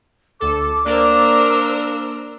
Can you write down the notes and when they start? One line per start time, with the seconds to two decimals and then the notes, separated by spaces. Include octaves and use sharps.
0.40 D2 A4 D6
0.86 A#3 D4 A#4 C5 D5 E6